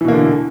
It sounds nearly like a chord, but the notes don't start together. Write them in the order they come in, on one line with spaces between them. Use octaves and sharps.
E3 B2 A#3 D3